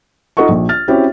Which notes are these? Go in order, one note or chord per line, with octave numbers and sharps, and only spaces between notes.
D#4 F4 A4 D#5 F#5 C#6
A#1
F6 A6
C4 C#4 E4 F#4 G4 C#5